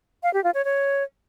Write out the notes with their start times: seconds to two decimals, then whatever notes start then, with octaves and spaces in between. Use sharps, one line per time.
0.23 F5
0.33 G4
0.44 F4
0.54 C#5
0.65 C#5